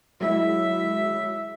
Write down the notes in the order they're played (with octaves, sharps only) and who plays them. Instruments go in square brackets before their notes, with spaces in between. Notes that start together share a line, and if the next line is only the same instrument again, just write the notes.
[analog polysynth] F#3 G#3 E4 [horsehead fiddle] E5